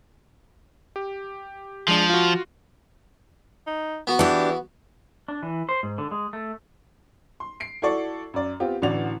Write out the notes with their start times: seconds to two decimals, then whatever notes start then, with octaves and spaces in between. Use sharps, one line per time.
0.96 G4
1.88 F3 G#3 D4
2.10 F4 F#4
3.67 D#4
4.07 B3 F#4
4.19 E3 D4 G4
5.28 D4
5.43 E3
5.69 C5
5.83 G#2
5.98 D3
6.11 G#3
6.33 A3
7.40 C6
7.60 C7 D7
7.82 E4 F#4 A4 D5 C#6
8.34 F#2 D5
8.60 B3 C4 F4 G4
8.82 A1 D3 E3 F#4 D5 F7